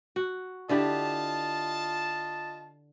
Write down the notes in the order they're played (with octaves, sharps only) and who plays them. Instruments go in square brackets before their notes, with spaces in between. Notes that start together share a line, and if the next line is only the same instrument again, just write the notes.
[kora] F#4
[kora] D3 E4 G4 [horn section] F4 D#5 A5